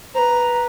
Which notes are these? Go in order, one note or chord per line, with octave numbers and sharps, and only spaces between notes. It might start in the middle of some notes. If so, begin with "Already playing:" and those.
B4 C5 A#5